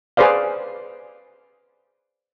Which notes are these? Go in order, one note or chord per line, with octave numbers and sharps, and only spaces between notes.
G#4 B4 C5 D5 F5